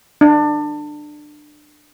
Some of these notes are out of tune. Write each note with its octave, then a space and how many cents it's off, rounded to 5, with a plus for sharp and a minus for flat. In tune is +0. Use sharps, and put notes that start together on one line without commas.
D4 +25